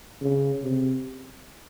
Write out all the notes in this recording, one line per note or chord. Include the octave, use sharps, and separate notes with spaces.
C#3
C3